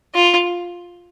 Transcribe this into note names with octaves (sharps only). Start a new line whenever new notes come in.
F4